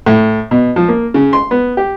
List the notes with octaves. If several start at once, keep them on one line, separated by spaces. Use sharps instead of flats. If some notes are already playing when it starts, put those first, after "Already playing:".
A2
B2
F3
A#3
C#3
C6
B3
G4